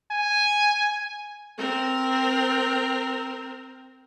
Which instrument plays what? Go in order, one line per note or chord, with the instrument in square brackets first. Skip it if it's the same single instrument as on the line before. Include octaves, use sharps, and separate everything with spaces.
[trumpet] G#5
[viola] C4 A#4